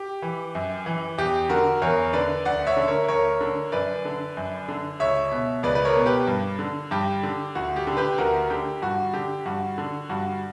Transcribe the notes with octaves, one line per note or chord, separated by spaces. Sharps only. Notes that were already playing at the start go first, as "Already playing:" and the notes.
Already playing: G4
E3
F#2
E3
E2 G4
D3 F#4 A#4
E2 A#4 C#5
D3 B4 D5
D2 D5 F#5
C#5 E5
D3
A#4 C#5
D2 A#4 C#5
D3
F#2 B4 D5
D3
F#2
D3
C#2 C#5 E5
B2
C#2 B4 D5
B4
A#4 C#5
B2
G4 B4
G2
D3
G2 G4
D3
D2 F#4
G4
D3
G4 B4
D2 F#4 A#4
D3 G4
G2 F#4
D3 G4
G2 F#4
D3
G2 F#4